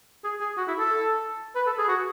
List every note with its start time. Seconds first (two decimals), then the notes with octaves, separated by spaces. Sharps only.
0.24 G#4
0.41 G#4
0.57 F#4
0.68 E4
0.79 A4
1.56 B4
1.67 A4
1.78 G#4
1.89 F#4